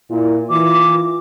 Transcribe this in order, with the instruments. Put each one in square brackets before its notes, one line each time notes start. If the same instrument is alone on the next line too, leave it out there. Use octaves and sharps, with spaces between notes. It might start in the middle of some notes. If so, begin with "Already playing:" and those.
[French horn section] A#2 E4
[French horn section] E3 F4 [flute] D6